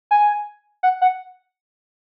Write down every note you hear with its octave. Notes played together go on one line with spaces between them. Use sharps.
G#5
F#5
F#5